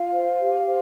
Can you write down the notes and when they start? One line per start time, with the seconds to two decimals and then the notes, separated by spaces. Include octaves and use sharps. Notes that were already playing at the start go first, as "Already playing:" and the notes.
Already playing: F4 F5
0.11 C5
0.39 G4
0.66 C5